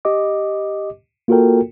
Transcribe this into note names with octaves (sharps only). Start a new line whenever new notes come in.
G4 D#5 D6
A#3 F4 F#4 A4 A#4 G5